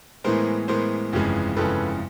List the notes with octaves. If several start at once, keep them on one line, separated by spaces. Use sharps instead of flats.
A2 E3 G#3 B3 A#4 C5
A2 E3 G#3 B3 A#4 C5
G1 F2 C#3 E3 G#3
G1 F2 C#3 E3 G#3 A4 B4